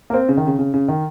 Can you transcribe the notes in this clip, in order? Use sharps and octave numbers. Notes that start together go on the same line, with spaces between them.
A#3
C4
C#3
D#3
C#3
C#3
C#3
D#3